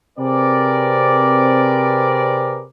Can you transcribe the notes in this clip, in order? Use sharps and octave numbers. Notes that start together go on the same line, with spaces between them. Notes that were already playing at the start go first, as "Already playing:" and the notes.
C3 C4 G#4 A#4 B4 D5